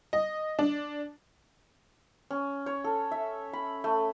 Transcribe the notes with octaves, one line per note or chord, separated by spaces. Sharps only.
D#5
D4
C#4
C#5
A4
E5
B5
A3